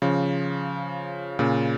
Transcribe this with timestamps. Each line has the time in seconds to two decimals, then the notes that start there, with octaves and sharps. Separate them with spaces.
0.02 C#3 F3
1.39 A#2 C#3